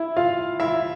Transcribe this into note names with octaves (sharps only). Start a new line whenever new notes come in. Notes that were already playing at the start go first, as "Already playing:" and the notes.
Already playing: E4 E5
F4 F5
E4 E5